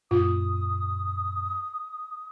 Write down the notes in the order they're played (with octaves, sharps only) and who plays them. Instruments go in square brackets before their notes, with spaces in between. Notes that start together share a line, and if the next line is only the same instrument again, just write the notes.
[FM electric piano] F#2 A#2 [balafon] F4 [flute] D#6